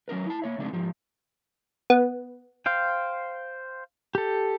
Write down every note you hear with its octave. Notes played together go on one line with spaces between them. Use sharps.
F#3 C#4 A#4 B4
E4 A5
A#3 C#5 E5
C#3 G#3 A3 B3 C4 D4
G#2 F3 G4
B3
C5 F5 G5
G4 A4